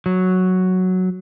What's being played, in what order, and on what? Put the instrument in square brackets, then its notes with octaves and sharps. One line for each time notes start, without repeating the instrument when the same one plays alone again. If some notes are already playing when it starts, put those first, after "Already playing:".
[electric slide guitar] F#3